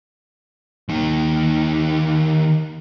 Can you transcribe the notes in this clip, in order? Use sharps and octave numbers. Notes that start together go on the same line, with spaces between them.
D#2 D#3